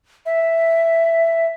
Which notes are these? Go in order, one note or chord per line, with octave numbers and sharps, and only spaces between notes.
E5